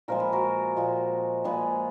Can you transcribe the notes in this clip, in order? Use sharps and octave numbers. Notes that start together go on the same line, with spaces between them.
A#2 F3 G#3 A#4
B4
F#4 A#4
A#2 F3 G#3
A#2 F3 G#3 G#4 B4